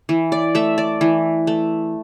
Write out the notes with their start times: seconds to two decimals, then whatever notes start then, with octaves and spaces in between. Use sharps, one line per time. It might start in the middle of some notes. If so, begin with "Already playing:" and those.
0.09 E3
0.32 D5
0.55 A3 E5
0.78 D5
1.01 E3
1.47 A3